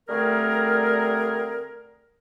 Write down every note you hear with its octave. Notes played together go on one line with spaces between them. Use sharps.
D3 G3 A3 C4 G#4 A#4